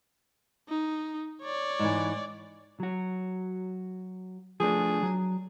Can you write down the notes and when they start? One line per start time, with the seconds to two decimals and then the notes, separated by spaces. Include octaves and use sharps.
0.69 D#4
1.42 C#5 D5
1.79 G#2 E3
2.80 F#3 F#4
4.60 F3 A3 D4 G#4
5.03 F#3